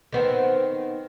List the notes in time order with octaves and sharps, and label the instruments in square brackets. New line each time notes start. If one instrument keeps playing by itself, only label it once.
[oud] D#3 B3 C4